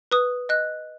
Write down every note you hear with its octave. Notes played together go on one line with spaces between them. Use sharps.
B4 D#6
D#5 F#6